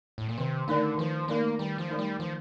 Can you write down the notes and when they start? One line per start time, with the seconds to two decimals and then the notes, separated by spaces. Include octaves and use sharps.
0.18 A2
0.29 A#2
0.38 C3 D#3
0.68 D3 A3 D#4 A#4 D5
0.98 D#3 F3
1.28 A3 A#3 D#4 A#4 D5
1.59 D#3 G3
1.78 F3
1.89 A3 D#4 A#4 D5
1.99 G3
2.19 D#3 F3